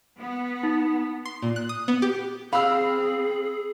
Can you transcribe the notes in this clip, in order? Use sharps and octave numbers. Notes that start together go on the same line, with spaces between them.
B3
D#4
C6
A#2
F#6
D#6
B3
G4
C4 G#4 F5 B5 E6